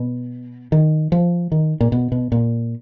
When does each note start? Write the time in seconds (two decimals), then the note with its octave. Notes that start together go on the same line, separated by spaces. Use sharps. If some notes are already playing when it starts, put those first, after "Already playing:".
Already playing: B2
0.72 D#3
1.12 F3
1.52 D#3
1.80 A#2
1.92 B2
2.12 B2
2.32 A#2